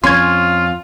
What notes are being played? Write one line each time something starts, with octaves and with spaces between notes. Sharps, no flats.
F2 C#4 F4 C6 G#6